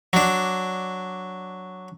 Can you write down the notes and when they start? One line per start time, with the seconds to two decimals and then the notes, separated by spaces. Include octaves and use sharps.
0.13 F#3 D4